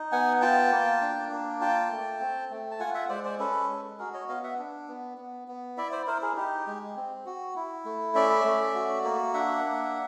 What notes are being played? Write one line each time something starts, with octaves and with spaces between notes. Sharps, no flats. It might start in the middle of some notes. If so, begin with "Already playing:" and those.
Already playing: D#4
B3 F#5 G#5
F4 G5 A5
A#3
D4
A#3
F4 G5 A5
A3
C4
A3
A5
F4 F#5 G#5
E5 F#5
G#3 C5 D5
C5 D5
C#4 A4 B4
G#3
F#4 G#4 A#4
C#5 D#5
B3 D#5 F5
E5 F#5
D4
B3
B3
B3
E4 D5 E5
C5 D5
E4 A#4 C5
G#4 A#4
D#4 G4
G#3
C4
F#4
E4
A3
C#4 D5 E5
A3
F#4
A#3
D4 E5 F#5
A#3